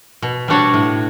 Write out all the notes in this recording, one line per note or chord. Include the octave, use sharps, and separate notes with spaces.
B2
G3 D4 F#4 C#5
A2